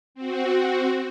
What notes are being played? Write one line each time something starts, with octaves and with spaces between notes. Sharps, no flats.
C4 F#4